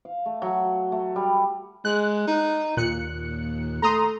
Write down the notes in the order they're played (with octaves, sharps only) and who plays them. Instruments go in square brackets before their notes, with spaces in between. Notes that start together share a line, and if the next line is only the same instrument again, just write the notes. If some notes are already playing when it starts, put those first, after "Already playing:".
[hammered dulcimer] F5
A3
F#3
A3
G3
[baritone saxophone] G#3 [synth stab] F#6
[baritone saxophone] D#4
[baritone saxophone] D#2 [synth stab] A#2 F#6 C#7
[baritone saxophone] A3 [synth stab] A#5 C6 D#6